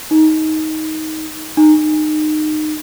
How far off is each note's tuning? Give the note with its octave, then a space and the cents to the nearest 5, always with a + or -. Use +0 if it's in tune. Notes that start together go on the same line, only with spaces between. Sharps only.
D#4 +15
D#4 -20